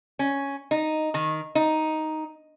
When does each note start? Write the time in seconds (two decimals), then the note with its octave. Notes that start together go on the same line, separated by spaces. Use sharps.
0.19 C#4
0.71 D#4
1.14 D#3
1.55 D#4